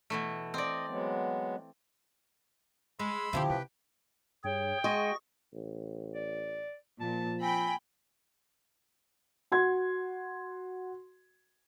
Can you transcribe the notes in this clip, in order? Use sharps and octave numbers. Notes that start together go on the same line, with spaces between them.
B2 E3 A3
C4 D5 D#5
F#3 G#3 B3
G#3 B5 C6 E6
B2 D3 F3 E4 F4 G4
C3 B4 G5
G2 G#4 C#5 G5
G#3 F#4 G#4 D#5 C#6 A#6
A1
D5
A#2 F3 A5
C4 G5 G#5 B5
F#4 C6 G#6